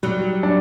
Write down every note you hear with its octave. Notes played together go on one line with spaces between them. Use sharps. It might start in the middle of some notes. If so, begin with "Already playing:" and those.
F#3 G3
D4